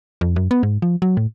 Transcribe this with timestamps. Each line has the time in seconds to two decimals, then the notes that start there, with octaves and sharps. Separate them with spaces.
0.21 F2
0.36 F#2
0.51 B3
0.63 G#2
0.82 F3
1.02 F#3
1.17 A2